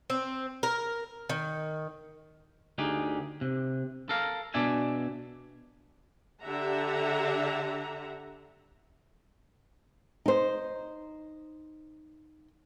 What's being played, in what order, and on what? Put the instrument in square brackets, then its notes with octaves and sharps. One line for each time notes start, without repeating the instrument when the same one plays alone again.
[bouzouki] C4
A#4
D#3
[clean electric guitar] D2 D#4 G4 G#4
C3
A4 A#4 F5
B2 D4 D5 E5 G#5
[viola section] D3 D4 G4 E5 F#5 A#5
[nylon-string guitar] D#4 C5